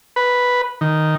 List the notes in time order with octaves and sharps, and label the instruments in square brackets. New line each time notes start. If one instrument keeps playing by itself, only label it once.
[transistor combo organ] B4
D#3